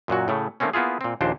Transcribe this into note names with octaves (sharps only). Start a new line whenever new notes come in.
F#2 A#2 F#3 F#4
A2 C#3 A3
D#3 A3 A#3 C4 C#4
A#3 B3 E4 F4 G#4
A#2 C4
A#1 D#2 A#2 D4 C5